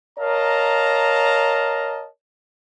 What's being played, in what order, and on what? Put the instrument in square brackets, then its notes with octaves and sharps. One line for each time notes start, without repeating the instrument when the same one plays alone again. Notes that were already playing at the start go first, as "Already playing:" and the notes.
[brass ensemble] A#4 C#5 D#5 F5 A5 A#5